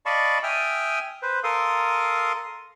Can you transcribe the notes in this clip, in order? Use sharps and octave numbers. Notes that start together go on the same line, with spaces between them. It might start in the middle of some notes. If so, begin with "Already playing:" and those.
D5 D#5 F5 A5 B5 C#6
E5 G5 G#5 D#6 F6
B4 C5
A4 A#4 F5 C6 D#6